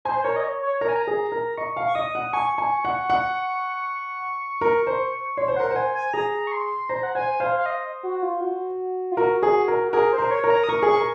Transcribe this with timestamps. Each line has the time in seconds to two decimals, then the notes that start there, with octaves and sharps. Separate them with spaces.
0.05 C5 G#5
0.20 C5
0.24 A#4 C#5
0.36 D#5
0.43 C#5
0.62 C#5
0.81 A#4 A#5
0.89 G#5
0.96 A#5
1.07 G#4
1.32 A#4
1.58 D#5 C#6
1.77 F5
1.86 C#6
1.95 D#5 D#6
2.15 F#5
2.33 G#5 C#6
2.58 G#5
2.85 F#5
3.10 F#5
4.61 A#4
4.87 C5
5.37 C#5 C6
5.48 C5
5.56 A#4 F#5
5.71 C5
5.76 G#5
5.94 G#5
6.13 G#4 A#5
6.47 C#6
6.52 C6
6.89 C5 A#5
7.03 F#5
7.15 C5 G#5
7.40 C5 F5
7.58 F5
7.66 D#5
8.03 F#4
8.22 F4
8.41 F#4
9.12 F4
9.17 F#4 A#4
9.43 G#4
9.68 A#4
9.88 F#4
9.93 G#4 A#4
10.12 C5
10.18 A#4
10.31 C#5
10.44 A#4
10.50 A#5
10.64 D#6
10.69 A#4 C#6
10.82 G#4
10.87 C#6
10.96 A#4